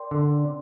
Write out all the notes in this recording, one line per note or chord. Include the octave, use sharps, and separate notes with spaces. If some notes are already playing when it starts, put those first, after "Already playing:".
Already playing: A#4 D5 G5 C6
D3